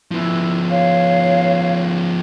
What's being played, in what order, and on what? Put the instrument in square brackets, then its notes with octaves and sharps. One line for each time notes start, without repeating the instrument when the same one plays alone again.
[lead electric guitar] F3 B3 [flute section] E4
[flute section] C#5 F5